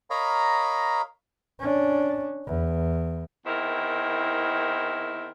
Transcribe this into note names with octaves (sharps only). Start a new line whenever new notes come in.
A#4 C#5 D#5 F5 A#5 B5
C#4 D4
E2
E2 D#3 C4 E4 A#4